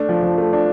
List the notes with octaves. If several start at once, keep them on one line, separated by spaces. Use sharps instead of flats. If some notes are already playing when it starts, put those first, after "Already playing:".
Already playing: A3 D4
F3
F3
A3
D4